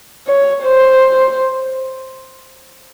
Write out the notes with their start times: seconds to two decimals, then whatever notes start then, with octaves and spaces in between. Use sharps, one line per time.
0.27 C#5
0.64 C5